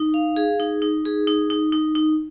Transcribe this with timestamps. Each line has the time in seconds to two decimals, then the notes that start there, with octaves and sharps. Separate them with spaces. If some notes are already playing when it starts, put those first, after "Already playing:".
Already playing: D#4
0.14 F5
0.36 G#4
0.60 D#4
0.82 D#4
1.05 G#4
1.27 D#4
1.50 D#4
1.73 D#4
1.95 D#4